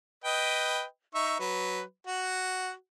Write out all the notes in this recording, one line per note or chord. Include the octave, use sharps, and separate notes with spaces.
B4 D#5 G5
D#4 E5 C#6
F#3 B4
F#4 F#5